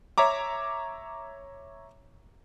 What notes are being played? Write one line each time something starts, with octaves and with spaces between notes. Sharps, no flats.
C#5 E5 A#5 D6